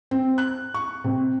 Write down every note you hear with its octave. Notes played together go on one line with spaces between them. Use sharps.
C4
F#6
C#6
C3